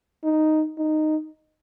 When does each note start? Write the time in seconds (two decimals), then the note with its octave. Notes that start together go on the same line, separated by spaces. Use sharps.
0.24 D#4
0.78 D#4